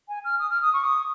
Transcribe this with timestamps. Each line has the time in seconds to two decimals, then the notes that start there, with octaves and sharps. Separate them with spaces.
0.08 G#5
0.24 F6
0.39 D#6
0.50 F6
0.62 D#6
0.73 C#6
0.84 D#6